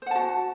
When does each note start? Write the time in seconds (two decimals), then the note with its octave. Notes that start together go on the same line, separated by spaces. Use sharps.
0.02 C5
0.06 F#5
0.11 A5
0.15 F#4